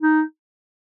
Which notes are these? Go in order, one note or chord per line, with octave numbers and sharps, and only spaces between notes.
D#4